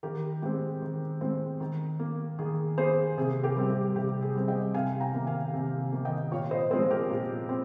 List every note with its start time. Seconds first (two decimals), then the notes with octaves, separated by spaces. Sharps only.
0.03 D#3 G4 A#4
0.42 G#3 C4 G4
0.82 D#3
1.21 G#3 C4
1.60 D#3
1.99 A#3
2.39 D#3 G#4
2.78 A#3 G#4 C5
3.18 C3 G#4
3.43 G4 A#4
3.57 G3 C4
3.70 G4
3.96 C3 G4
4.22 G#4
4.35 G3 C4
4.48 D#5 G5
4.74 C3 F5 G#5
5.00 G5 A#5
5.13 D#3 A#3
5.27 F5 G#5
5.53 C3
5.92 D#3 A#3
6.05 D#5 G5
6.32 A#2 C#5 F5
6.51 C5 D#5
6.71 F3 G#3 C4 G#4 C5
6.91 G4 A#4
7.10 A#2
7.49 C4